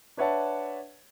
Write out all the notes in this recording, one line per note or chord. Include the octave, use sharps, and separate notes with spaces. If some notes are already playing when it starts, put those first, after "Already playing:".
D4 B4 C#5 E5 F#5 A5